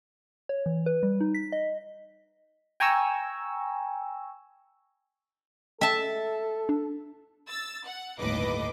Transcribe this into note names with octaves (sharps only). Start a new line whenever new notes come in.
C#5
E3
B4
G3
D#4
B6
D#5
G5 G#5 A#5 C#6 E6
A4 E5 G5 A5
D4
E6 A6
F#5
G1 D#2 A2 B4 D#5 D6